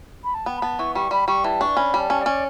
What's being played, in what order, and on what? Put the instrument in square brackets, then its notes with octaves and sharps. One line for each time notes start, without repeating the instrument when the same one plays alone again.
[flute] B5
A5
[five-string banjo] B3 [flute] G5
[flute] B5
[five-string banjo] B3 [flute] A5
[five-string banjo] E3 [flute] C#6
[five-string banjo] G3 [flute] C#6
[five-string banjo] G3 [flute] B5
[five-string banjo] G3 [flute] C#6
[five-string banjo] E3 [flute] A5
[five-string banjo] D4 [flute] C#6
[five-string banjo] C#4 [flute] B5
[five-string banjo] G3
[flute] A5
[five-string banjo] C#4
[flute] D5
[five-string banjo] C#4